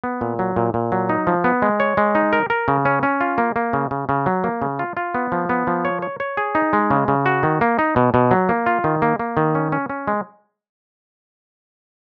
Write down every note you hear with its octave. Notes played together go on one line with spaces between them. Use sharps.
B3
A#2
F#3
A#2
A#2
F#3
D#4
F3
B3
G#3
C#5
G#3
D#4
A#4
A#4
C#3
C#4
C#4
F4
A#3
A#3
C#3
C#3
C#3
F#3
A#3
C#3
F4
F4
B3
F3
B3
F3
C#5
C#5
C#5
G#4
D#4
G#3
C#3
C#3
F#4
D#3
A#3
D#4
B2
B2
F#3
A#3
F4
D#3
A#3
A#3
D#3
C#4
C#4
C#4
G#3